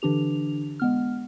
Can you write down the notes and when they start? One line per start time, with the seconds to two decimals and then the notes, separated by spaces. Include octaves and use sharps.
0.02 D3 E3 D4 G4 F7
0.80 G#3 B3 F6